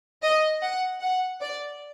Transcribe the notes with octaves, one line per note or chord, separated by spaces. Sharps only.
D#5
F#5
F#5
D5